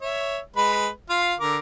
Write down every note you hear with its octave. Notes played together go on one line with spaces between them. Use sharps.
C#5 E5
G#3 B4 B5
F4 F5
D3 A#4 D6